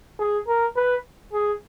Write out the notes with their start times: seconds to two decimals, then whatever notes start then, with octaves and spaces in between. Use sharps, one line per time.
0.19 G#4
0.47 A#4
0.76 B4
1.33 G#4